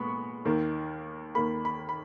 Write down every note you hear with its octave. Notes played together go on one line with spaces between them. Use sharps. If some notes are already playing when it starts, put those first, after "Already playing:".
Already playing: A#2 G#3 B3 B5 C#6
D#2 D#3 A#3
D#2 D#3 A#3 B5
B5
B5